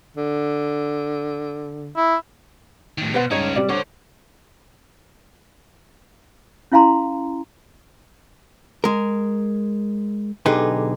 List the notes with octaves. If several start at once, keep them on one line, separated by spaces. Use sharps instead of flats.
D3
E4
A2 D#3
B2 B4 C5 F#5
G2 G#3 C#4 D#4 C#5
C3 G3 D5
D4 A4 C5 C#5 F#5
C#4 E4 F5 G#5 A#5 C6
G#3 A#4
B1 D3 D#4 G4 G#4 B4